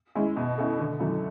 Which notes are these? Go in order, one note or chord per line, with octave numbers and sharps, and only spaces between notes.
G#3 C#4 E4
B2
A3 C#4 E4
D3
F#3 A3 C#4 E4